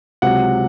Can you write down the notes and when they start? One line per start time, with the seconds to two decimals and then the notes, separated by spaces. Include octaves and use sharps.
0.22 C#2 C3 F#3 F#5